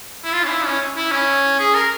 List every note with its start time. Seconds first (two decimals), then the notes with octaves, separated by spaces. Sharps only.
0.24 E4
0.33 F4
0.44 C#4
0.49 E4
0.65 C#4
0.97 E4
1.12 C#4
1.59 G#4
1.75 A#4